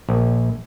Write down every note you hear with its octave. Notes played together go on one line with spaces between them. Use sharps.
A#1